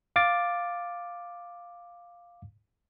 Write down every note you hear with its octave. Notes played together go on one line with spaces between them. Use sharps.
F5 D6 A6